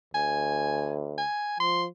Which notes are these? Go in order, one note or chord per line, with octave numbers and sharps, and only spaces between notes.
D2 G#5
G#5
F3 C6